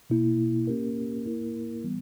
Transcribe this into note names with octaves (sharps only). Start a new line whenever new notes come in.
B2 A#3 E4
A#3 C#4 G4 A#4
A#3 E4 A#4
E3 G3 B3